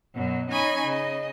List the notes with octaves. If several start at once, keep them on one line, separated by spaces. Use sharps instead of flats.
F#2 B2 F#3
C#4 D#4 D#5 G#5 B5 C#6
C#3 D#5